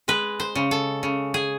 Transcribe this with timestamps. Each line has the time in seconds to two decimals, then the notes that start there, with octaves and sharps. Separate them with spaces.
0.08 G#3 B4
0.40 C5
0.55 C#3
0.71 A4
1.03 C#3
1.34 G#4